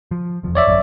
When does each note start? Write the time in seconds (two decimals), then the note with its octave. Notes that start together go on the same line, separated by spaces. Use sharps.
0.11 F3
0.43 F1 E2 F3
0.55 C#5 D5 E5
0.67 G#1 F#2